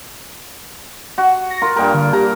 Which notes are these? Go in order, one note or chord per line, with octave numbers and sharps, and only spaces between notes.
F#4
A#6
F4 A#4
G2 A#2 A#4 G5
D3
G4 A#5